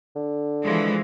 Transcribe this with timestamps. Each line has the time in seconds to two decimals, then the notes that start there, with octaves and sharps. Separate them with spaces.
0.16 D3
0.63 E3 F3 G#3